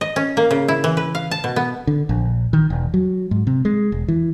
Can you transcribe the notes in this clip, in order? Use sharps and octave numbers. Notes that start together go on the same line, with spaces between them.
D#5
C#4
A#3
C#3
E4
E3
B4
F5
A5
B2
B3
D3
A#1
D#3
E1
F#3
G#2
C3
G#3
E1
E3